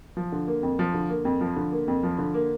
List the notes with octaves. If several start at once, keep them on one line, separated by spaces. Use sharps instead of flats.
F3
D3
A#3
F2
F3
D3
A#3
F2
F3
D3
A#3
F2
F3
D3
A#3